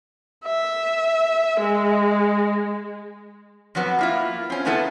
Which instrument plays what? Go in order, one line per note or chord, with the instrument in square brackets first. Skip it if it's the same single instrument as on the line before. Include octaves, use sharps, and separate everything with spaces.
[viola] E5
G#3
[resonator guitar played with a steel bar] F2 F3 F#3 B3
A#3 E4 F4
C4 C#4
A#2 C#3 A3 B3 E4 A4